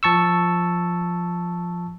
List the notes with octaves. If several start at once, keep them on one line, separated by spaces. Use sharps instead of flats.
F3 A5 C#6 E6